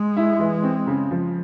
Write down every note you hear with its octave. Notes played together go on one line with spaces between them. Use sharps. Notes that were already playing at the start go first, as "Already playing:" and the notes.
Already playing: G#3
E4
E3
C4
C#3
F3